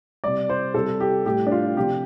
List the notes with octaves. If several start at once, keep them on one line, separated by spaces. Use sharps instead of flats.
C3 G3 D5
C5
C3 G3 A4
G4
A2 G3 G4
D4
F4
C3 F3 G4